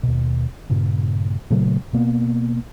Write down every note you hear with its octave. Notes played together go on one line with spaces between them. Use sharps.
D#2 B2
G2 A#2 C#3
A#2 C#3 F#3 A3
B2 A#3 B3